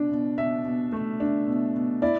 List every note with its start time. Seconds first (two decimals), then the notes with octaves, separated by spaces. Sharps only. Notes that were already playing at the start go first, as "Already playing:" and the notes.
Already playing: B2 D4
0.11 B2
0.38 B2 E5
0.65 B2
0.92 A3
1.20 D4
1.47 B2
1.75 B2
2.02 E4 D5